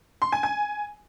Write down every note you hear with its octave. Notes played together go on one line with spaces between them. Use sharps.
C6
G#5
G#5